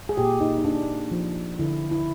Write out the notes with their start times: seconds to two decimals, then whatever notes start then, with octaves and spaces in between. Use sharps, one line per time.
0.09 G#4
0.17 A#2 G4
0.41 D#4
0.58 D#4
0.64 A#3 D4
1.11 F3
1.59 D3 E4
1.91 E4